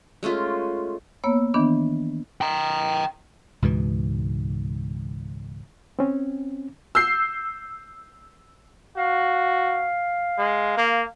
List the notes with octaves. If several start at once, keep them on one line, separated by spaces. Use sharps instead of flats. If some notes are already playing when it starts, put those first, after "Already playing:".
G#3 A3 C#4 F4
A#3 B3 C#5 E6
D#3 E3 B3 D4
G5 A#5
C#2 G#2 B2 E3
C4 C#4
E6 G6 C7
F#4 F5
G#3
A#3